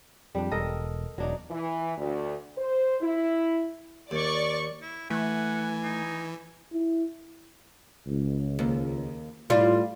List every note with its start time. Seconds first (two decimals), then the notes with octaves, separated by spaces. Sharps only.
0.35 F2 G3 D4
0.51 E1 A4 A#4 D#5
1.18 E1 F#3 D4 D#4
1.51 E3
1.97 D2
2.57 C5
3.02 E4
4.11 D#2 D5 C#6
4.82 E4
5.10 E3 A3 F#5 G#5
5.84 D#4
6.73 E4
8.06 C#2
8.59 D#2
9.50 A2 G3 F4